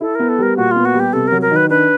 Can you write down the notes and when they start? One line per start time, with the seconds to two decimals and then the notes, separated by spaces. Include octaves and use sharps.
0.01 E4 A4
0.15 B3 A#4
0.29 A4
0.39 G3 A#4
0.57 A#2 F#4
0.71 B3 F4
0.85 F#4
0.94 G3
1.00 G4
1.13 C3 A4
1.27 F#3 A#4
1.42 A#4
1.51 D#3
1.56 B4
1.70 D4 B4